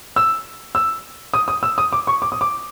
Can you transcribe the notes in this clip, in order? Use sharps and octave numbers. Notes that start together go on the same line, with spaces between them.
E6
E6
D#6
D#6
E6
D#6
D6
C#6
D6
D#6
D6